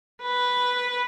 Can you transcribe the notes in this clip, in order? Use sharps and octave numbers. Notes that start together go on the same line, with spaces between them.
B4